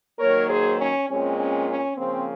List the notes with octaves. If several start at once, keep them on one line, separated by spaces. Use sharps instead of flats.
D#3 F#3 A#3 A#4 C#5
G#4 C5
C#4
A#2 G#3 C4 C#4
C#4
C#4
C#3 F3 A#3 C4